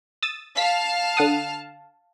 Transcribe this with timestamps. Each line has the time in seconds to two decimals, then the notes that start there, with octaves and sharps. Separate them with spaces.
0.23 D#6 E6 A6
0.57 F5 A5 F6 B6
1.17 D3 F#5 D#6